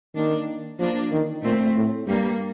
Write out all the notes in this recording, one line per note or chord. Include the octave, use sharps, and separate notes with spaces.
D#3 A#3 D4
F3 A#3 D4
D#3
A#2 A3 C4
A2
G2 G3 A#3